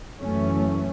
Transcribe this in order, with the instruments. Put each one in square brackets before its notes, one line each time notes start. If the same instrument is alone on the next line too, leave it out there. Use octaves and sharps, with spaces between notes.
[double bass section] F#2 E3 A3 C#4